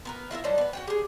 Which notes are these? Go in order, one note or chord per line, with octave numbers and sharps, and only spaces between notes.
B3 A#4 B4
E4 F4 A#4 E5
D#3 F#3 G3 D4
B3 B4
F#4 F#5 G5
G4 G#4